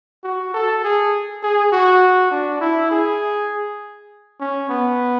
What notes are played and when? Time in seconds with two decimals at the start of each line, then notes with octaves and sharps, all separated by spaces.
0.24 F#4
0.54 A4
0.84 G#4
1.43 G#4
1.72 F#4
2.31 D4
2.61 E4
2.91 G#4
4.40 C#4
4.69 B3